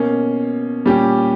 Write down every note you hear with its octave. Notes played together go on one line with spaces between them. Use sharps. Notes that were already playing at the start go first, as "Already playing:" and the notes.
Already playing: B2 A#3 C#4
A#2 G3 C#4 G4